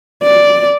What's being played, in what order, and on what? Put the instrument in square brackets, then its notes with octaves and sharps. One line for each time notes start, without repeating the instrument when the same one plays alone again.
[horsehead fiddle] D5